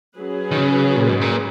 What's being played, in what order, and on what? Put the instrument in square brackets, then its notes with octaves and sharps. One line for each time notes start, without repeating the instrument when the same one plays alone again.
[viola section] F#3 C#4 G#4 B4
[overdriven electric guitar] D#3
C#3
A#2
G#2
A#2